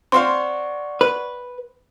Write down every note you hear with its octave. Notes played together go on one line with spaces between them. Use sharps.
C4 C5 D5 F5 F#5 C6 C#6
B4